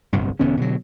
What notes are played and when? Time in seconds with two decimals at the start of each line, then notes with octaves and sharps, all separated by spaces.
0.13 D1 G1 C2 G2
0.39 E1 D3 B3 C#4
0.57 B2 D3 F#3